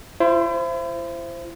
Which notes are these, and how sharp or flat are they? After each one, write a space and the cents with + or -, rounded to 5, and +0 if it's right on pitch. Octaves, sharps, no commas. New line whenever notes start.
E4 +40 C5 +0